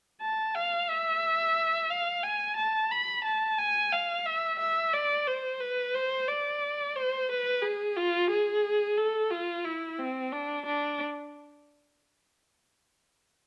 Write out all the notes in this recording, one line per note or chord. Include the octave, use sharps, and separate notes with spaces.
A5
F5
E5
F5
G#5
A5
B5
A5
G#5
F5
E5
E5
D5
C5
B4
C5
D5
C5
B4
G#4
F4
G#4
A4
F4
E4
C4
D4
D4